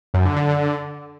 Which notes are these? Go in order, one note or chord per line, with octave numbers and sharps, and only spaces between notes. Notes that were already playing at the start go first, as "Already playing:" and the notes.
F#2
D3
D3